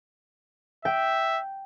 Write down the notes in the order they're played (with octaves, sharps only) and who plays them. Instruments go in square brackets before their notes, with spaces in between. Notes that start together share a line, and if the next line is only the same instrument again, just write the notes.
[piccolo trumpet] E5 [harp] G5